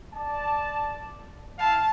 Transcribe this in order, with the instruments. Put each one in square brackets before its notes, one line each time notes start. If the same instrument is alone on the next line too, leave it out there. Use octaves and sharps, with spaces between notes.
[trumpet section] D5 A5
[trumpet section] E4 F5 [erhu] A5